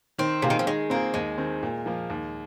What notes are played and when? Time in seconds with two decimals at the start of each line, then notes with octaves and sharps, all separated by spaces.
0.18 D#3 C4
0.42 C3 A#3 F4 G#4
0.50 D#3
0.59 F3
0.67 D#3 G#3
0.90 A#3 C4 F4 G#4
1.14 D#2 G#3
1.38 D#3 C4
1.63 A#2
1.86 F3 A#3
2.10 D#2